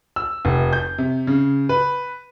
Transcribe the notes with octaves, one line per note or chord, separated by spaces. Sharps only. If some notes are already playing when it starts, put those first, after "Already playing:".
E6
F1
G6
C3
C#3
B4